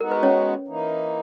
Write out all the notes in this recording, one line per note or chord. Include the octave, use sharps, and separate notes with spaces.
G#3 B3 D#4 F#4 A#4
B4
C#4 C#5
E3 A#3 D#4